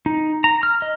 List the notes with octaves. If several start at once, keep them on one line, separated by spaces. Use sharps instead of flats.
D#4
A#5
F6
D#5